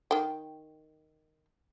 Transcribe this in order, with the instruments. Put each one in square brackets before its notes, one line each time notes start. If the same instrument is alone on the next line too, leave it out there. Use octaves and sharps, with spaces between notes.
[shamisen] D#3 G5